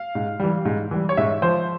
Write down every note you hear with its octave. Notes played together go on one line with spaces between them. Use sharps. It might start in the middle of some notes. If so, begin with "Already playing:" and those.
Already playing: F5
G#2
E3 G3
G#2
E3 G3
C#5
G#2 E5
F3 C5